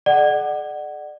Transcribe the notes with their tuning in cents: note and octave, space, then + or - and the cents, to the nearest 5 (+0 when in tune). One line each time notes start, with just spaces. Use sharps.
G#4 +45 D5 +30 F#5 +10